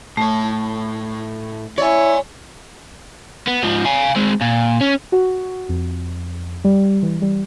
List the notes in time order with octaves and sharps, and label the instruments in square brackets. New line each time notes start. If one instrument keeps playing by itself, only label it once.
[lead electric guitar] A2 C#5 [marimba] A3
[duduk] E4 [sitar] C#5 [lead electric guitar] D5 G#5
[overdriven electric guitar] B3
G#2 F3
F5 G#5
G#3 C4
A#2
C#4
[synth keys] F#4
F2
G3
E3
G3